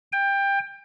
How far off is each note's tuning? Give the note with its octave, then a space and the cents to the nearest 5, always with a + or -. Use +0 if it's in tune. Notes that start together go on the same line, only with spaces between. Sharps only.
G5 +20